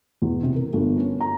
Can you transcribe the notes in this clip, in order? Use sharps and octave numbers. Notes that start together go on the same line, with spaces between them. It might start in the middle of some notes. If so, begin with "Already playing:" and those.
E2
C3
A#4
G1
C#4
A#5